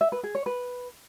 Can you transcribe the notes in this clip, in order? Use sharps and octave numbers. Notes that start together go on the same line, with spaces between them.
E5
B4
G#4
C#5
B4